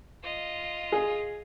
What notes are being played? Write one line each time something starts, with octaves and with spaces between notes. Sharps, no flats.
F4 D#5
G#4